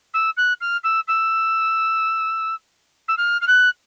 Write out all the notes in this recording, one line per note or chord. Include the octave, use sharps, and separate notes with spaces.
E6
F#6
F6
E6
E6
E6
F6
F6
F#6